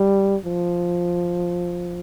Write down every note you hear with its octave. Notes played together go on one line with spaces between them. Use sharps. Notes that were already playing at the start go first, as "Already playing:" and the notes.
Already playing: G3
F3